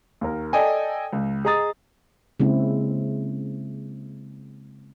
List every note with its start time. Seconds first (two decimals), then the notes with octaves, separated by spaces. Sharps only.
0.21 D#2 A#4
0.53 A4 D5 D#5 G5 G#5
1.12 C#2
1.45 G#4 D#5 A#5 D#6 A6
2.40 C#3 G#3 A#3 C4 E4